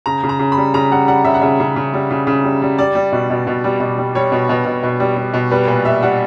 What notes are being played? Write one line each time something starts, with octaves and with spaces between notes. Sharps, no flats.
C#3 A#5
C#3
A#5
C#3
B5
G3
C#3 A#5
G3 F#5
G3 F#5
C#3 E5
F#5
C#3 E5
C#3
C#3
G3
C#3
C#3
G3
G3
G3 D5
G3
B2
B2
B2
G3
B2
G3
G3 C#5
B2
B2
B2
B2
G3
G3
B2
G3 B4
A#2 B4
G3 E5
G3 F#5